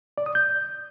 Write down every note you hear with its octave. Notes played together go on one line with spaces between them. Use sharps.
D5
D#6
G6